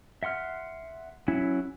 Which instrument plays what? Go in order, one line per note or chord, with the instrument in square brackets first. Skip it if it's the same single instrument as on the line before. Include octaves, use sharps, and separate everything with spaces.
[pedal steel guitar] E5 F#5 C6 F6
F#3 C#4 E4